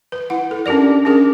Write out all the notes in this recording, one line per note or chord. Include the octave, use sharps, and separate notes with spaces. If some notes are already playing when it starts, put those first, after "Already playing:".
B4
E4 F#5
A4
C#4 D4 G4 A#4 D5
C#4 G4 G#4 A#4